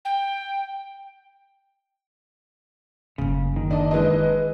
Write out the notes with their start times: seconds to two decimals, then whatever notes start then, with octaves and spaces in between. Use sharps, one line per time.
0.05 G5
3.18 F#1 C#3 A#3
3.56 D#3
3.71 D4 D5 D#5
3.91 E3 G#3 B4 D#5